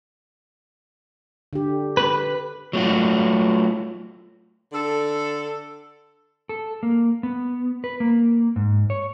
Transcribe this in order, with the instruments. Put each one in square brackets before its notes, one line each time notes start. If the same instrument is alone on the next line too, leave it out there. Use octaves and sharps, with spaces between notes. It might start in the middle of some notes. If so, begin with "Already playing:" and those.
[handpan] D3 G4
[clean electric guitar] B4
[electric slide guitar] F#3 A3 F4 F#4
[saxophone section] D3 A4
[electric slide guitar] A4
A#3
B3
B4
A#3
G#2
C#5